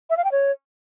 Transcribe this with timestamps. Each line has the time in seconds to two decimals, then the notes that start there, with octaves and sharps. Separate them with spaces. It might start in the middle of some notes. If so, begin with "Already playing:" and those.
0.10 E5
0.17 F5
0.24 G5
0.32 C#5